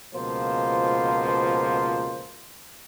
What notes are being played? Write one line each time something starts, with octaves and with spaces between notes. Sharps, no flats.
C#2 B2 F3 A#3 C5